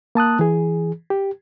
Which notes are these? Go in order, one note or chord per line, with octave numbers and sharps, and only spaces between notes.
A#3 A5 D#6 F#6
E3 G#4
G4